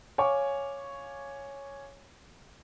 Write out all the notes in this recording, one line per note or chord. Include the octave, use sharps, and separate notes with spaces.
C#5 F5 G#5 C#6 D6